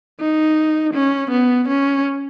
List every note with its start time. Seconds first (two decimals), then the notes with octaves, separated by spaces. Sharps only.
0.21 D#4
0.94 C#4
1.31 B3
1.69 C#4